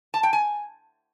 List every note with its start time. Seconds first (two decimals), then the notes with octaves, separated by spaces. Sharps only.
0.14 A5
0.23 G5
0.33 G#5